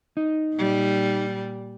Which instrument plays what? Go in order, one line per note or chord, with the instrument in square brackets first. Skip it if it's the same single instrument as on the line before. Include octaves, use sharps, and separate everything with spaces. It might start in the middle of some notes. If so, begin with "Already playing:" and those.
[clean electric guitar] D#4
[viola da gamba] A#2 G3